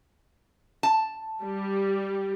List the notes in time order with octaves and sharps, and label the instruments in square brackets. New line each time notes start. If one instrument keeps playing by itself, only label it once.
[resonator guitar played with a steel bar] A5
[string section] G3